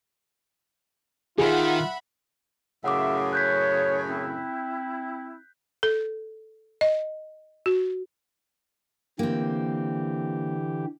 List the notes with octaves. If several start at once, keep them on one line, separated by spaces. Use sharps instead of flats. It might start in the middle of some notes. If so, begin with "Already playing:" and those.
D#3 F4 G#4 E5 F#5 B5
F#2 A2 C#3 E5 F#5 D6
C#5 F#6 G6 B6
C4 E4
A4
D#5
F#4
D3 E3 A#3 C4 G4